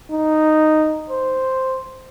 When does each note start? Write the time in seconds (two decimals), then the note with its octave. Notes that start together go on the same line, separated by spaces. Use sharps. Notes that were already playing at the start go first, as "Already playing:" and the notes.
0.12 D#4
1.10 C5